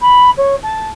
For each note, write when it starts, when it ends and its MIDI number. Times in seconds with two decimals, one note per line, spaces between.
0.02 0.30 83
0.37 0.56 73
0.63 0.89 81